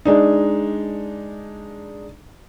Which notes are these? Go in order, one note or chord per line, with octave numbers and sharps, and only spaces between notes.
G#3 D4 D#4